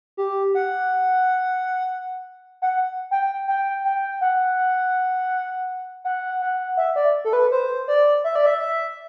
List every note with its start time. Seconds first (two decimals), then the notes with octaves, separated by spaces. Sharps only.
0.17 G4
0.55 F#5
2.62 F#5
3.11 G5
3.48 G5
3.85 G5
4.21 F#5
6.05 F#5
6.42 F#5
6.77 E5
6.96 D5
7.25 A4
7.33 B4
7.52 C5
7.88 D5
8.24 E5
8.35 D5
8.46 E5
8.61 E5